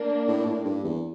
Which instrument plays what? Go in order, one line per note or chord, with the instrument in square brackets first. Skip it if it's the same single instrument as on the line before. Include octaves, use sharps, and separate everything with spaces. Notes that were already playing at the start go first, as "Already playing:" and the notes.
Already playing: [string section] A#3 D4
[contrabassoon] A2
A2
G2
E2